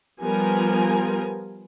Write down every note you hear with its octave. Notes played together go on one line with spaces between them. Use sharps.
F3 G3 B3 F4 A#4 G#5